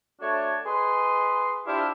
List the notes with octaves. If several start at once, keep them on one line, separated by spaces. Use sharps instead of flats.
A3 D4 F#4 A4 C#5
G#4 B4 D#5 C6
D4 E4 F4 G4 C5 F5